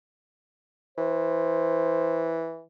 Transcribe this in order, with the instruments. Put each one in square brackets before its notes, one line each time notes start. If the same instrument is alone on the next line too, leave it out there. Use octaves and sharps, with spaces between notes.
[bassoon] E3 [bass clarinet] C5